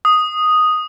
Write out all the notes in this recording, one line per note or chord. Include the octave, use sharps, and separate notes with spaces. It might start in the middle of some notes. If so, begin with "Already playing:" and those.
D#6